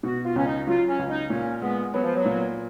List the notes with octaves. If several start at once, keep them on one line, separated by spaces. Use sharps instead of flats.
B2 F#4
F4
C#2 C#4
D#4
F#3 F4
C#4
C#2
D#4
A#2 C#4
G#3 B3
F#3 B3
F3
F#3
A#2